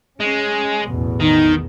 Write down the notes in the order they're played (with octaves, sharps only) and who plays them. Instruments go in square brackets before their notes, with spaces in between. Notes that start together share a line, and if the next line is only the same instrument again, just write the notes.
[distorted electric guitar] G#3 [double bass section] C#4
[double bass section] A1 E2 B2
[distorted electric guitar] D#3 [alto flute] D#4